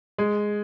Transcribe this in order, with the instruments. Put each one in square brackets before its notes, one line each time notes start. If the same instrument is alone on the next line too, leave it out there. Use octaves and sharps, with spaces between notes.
[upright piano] G#3